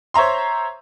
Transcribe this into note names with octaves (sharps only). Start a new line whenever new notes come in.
C5 C#5 E5 A#5 C6